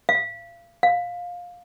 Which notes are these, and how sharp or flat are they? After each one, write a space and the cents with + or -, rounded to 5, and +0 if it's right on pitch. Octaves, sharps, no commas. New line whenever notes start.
F5 -35
F5 +20